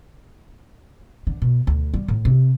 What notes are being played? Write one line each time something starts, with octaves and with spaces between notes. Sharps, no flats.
D3
B2
D2
G3
A2
C3